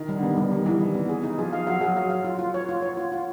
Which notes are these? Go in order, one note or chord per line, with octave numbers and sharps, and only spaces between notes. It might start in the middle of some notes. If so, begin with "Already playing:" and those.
Already playing: D#3
G3
D3
D#3 B3
G3
D#3 G3
E3 G3
G3
B3
G#4
D#4
F3 G#4
F5
F#3 F5
F#3 G#4
F#3 F5
F5
F4
F4
C#5
F4
C#5
F4
F4